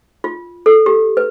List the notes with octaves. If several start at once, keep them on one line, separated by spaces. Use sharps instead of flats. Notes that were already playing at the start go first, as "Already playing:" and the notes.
F4
A4
G4
B4